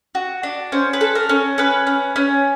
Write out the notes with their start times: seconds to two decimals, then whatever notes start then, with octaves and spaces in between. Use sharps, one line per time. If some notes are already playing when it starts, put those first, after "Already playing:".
0.15 F#4
0.43 D4
0.72 C#4 C5
0.93 B4
1.01 A4
1.15 A#4
1.29 C#4
1.58 C#4 B4
1.87 C#4
2.16 C#4